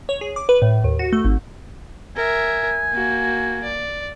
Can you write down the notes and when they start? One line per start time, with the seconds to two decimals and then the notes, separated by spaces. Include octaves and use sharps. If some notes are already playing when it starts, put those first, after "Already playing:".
0.09 C#5
0.21 G#4
0.36 D6
0.49 B4
0.62 A2
0.84 D#2
0.99 F#4
1.13 A3
1.24 G#1
2.16 A#4 E5 G#5
2.93 A#3 F#4
3.63 D5